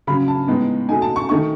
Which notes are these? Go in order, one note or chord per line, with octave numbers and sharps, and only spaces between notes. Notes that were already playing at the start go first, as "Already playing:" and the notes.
C#3 F#3 C#4 B5
A5
A2 G#3 B3 D#4
B2 A3 D#4 G#5
A5
C#6
D#3 A3 D#4 C#6